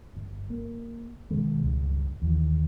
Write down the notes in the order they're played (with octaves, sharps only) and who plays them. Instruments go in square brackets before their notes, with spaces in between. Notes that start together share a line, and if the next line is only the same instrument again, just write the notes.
[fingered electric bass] G1
A#3
B2 D3 D#3 G#3
C#2 G2
D#2 D#3 E3